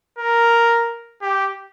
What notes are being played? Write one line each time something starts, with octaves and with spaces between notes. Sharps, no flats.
A#4
G4